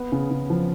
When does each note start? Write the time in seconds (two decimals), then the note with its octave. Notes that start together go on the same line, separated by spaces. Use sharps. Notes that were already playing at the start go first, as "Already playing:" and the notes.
Already playing: B3
0.12 C#3
0.31 C#3
0.50 F3